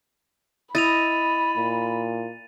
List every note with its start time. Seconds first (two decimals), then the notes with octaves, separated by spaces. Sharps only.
0.75 E4 D#5 B5 A6 D#7 F7
1.57 A#2